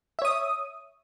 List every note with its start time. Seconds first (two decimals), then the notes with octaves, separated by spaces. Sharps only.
0.19 E5
0.22 C#5
0.25 D#6